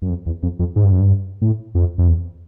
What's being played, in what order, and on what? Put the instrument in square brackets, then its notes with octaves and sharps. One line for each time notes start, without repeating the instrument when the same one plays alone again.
[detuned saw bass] F#2
F2
E2
F2
F2
G#2
G2
F#2
G2
A2
F2
F2
E2